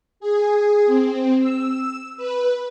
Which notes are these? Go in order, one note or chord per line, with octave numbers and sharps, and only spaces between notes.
G#4
C4
E6
B4